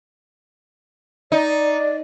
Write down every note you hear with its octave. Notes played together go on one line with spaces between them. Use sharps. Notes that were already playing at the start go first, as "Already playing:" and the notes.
D#4 D5